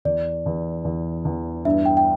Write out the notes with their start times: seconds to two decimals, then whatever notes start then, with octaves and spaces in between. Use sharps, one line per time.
0.05 E2 D5
0.46 E2
0.85 E2
1.25 E2
1.65 G2 E5
1.85 G5
1.97 G5